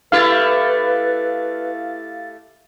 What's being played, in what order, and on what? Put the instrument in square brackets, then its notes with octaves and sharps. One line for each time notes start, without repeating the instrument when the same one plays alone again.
[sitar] A3 E4 G4 [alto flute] B4 [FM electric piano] F5 A6